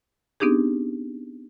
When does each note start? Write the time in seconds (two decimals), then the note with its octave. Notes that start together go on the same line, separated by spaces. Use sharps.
0.40 B3 C4 D4 D#4 G4 G#4